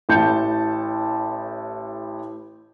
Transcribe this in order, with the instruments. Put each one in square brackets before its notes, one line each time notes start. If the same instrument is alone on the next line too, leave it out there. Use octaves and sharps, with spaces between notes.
[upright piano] A1 A2 A5 G6 C#7